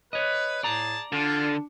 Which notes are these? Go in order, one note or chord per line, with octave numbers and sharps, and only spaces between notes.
B4 C#5 D#5
A2 G#4 D5 A5 A#5
D3 D4 F4